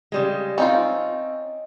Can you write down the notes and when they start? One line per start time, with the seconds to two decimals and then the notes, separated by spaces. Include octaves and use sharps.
0.12 C#3 G3 G#3
0.58 C4 C#4 D#4 F4 D#5